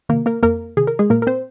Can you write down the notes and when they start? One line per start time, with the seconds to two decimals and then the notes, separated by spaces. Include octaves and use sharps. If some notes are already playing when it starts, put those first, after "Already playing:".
0.09 C3 D#3 A#3 A#4
0.26 A#3 A#4
0.43 F2 A#3 A#4
0.77 C3 D#3 G#4
0.87 A#4
0.99 G#3 G#4
1.10 A#2 A#3 A#4
1.22 A#4
1.27 C4 C5